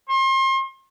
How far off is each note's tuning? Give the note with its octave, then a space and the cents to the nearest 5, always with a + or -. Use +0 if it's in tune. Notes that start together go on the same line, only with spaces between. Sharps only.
C6 +35